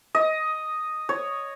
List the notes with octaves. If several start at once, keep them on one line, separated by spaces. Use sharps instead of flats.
D#5
C#5